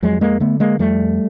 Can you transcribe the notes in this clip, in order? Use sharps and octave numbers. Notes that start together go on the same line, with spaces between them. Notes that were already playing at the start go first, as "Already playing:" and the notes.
F2 F#3 G#3
G#3 A#3
D3 A3 B3
G#3 A#3
F2 G3 A3